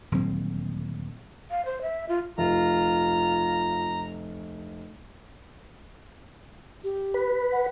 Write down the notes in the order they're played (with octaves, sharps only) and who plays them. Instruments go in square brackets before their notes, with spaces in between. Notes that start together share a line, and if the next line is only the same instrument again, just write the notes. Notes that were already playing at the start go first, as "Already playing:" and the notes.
[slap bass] D#1 D2 F#3 C4
[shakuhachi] F5
C5
E5
F4
[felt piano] F1 [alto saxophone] F4 [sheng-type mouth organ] A#5
[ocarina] G4
[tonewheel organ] B4
[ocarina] F#5